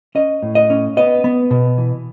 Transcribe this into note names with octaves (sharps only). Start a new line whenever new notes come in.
C#4 D#5
A2
D#5
C#4
B3 D#5
B3
B2
E3